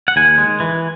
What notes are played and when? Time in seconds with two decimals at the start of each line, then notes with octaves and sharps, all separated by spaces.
0.08 F#5
0.16 D#2 G#5
0.38 G#3
0.60 E3